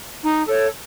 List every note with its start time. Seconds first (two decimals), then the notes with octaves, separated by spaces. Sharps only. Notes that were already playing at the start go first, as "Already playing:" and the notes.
0.22 D#4
0.46 A4 C#5